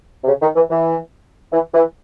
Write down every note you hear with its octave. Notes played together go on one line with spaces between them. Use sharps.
C3
C#3
D#3
E3
E3
E3
E3